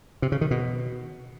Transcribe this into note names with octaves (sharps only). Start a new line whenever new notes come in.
C3
C#3
D#3
B2